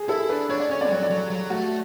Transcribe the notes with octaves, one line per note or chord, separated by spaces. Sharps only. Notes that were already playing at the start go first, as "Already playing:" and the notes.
Already playing: G#4
E4 A4
D4 B4
D4 C#5
D5
C#4 C#5
D5
F#3 C#5
D5
F#3 C#5
F#3
A3 F#4